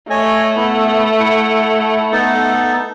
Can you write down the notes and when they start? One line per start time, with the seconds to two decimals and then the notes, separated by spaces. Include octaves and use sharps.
0.10 A3 C#5 D#5 G#5
0.56 B3 E4
1.20 E4 F#5
2.12 B3 D#4 A4